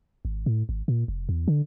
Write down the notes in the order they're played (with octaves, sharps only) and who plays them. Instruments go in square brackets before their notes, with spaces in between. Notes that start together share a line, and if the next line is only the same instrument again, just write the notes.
[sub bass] G#1
A2
G#1
A#2
F1
E2
D3